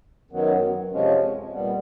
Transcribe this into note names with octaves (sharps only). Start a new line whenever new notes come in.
F#2 D#3 F#3 B3
F2 C3 F3 G#3 C#4
A#2 G3 B3